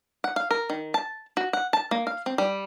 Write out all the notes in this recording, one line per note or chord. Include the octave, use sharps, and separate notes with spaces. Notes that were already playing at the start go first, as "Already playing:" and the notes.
F#5
F5
A#4
D#3
A5
F#4
F#5
A5
A#3
F5
C4
G3